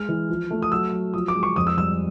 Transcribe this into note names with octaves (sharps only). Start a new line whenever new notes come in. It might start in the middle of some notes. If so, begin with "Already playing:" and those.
Already playing: G#3 F6
E3
F3
A3
D#6
F#3 E6
F#3
F3 D#6
D6
G#3
C#6
F2 D#6
E6
G3 E6